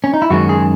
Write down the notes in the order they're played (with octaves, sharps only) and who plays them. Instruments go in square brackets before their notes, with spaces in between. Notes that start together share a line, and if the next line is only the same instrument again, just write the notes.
[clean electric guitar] C#4
D#4
E4
F#2 D#3 G#3 C#4 F#4
G#4